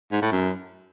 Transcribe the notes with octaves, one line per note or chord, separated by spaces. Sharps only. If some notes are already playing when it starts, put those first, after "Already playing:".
G#2
A2
F#2